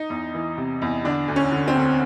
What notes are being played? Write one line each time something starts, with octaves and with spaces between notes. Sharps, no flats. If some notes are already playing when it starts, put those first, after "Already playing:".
Already playing: D#4
E2
E3
C3
E2
D3 D4
D2
C#4
D3
C4
D2